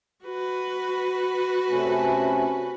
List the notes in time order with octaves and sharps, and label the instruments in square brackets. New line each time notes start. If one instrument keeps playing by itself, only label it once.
[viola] F#4 B4
[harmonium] C3 A3 C#4